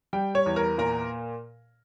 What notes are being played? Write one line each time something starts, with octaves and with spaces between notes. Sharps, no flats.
G3 G5
C#5
E2
A#4
A#2 A#4